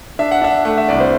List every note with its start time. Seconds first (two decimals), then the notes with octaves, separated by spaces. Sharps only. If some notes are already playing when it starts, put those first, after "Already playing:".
0.19 D4 E5
0.31 F#5
0.42 D4 E5
0.65 A3 F#5
0.78 E5
0.88 C2 D5
1.00 C5